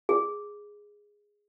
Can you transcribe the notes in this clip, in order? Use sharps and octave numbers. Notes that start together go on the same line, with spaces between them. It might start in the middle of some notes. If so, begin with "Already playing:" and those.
G#4